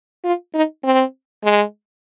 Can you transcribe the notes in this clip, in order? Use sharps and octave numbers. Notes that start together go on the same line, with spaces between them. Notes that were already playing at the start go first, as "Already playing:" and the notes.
F4
D#4
C4
G#3